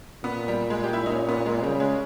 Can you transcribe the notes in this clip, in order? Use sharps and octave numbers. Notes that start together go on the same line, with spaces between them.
A#2 B3
G3
G#3
G4
E4
D#4
C#4
B3
G#3
C#3 G3
G#3